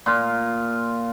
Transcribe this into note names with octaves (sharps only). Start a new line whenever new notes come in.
A#2 F4